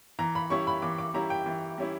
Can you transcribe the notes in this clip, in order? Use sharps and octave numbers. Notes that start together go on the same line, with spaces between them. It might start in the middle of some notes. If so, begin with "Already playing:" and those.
E3 A#5
B5
G3 C#4 E4 C#6
B5
E3 D6
D6
G3 C#4 E4 A#5
G5
E3
G3 C#4 E4